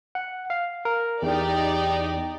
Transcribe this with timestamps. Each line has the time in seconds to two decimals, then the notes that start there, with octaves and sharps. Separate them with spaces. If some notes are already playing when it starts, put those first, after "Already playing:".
0.15 F#5
0.50 F5
0.85 A#4
1.22 E2 D#4 G4 D5